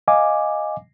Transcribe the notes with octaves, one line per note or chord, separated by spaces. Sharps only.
D#5 F5 G#5 D6